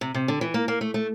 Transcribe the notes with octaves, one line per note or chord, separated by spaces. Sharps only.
C3
C3
D3
E3
A#3
A#3
A3
A3